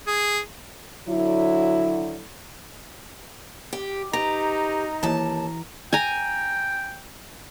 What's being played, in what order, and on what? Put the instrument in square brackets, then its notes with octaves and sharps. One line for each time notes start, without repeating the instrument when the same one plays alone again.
[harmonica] G#4
[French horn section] D3 F#3 E4
[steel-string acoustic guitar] G4
[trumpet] D#4 [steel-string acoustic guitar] G4 B4 [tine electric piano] A#5
[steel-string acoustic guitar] D#2 A5 [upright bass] E3
[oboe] G5 [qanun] G#5 A#5